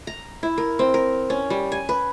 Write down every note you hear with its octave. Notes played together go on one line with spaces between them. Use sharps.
A#5
E4
A#4
C4
A#4
C#4
G3
G#5
B4